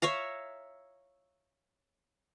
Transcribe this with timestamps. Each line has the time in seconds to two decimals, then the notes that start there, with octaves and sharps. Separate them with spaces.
0.02 C#5 E5 F5 A#5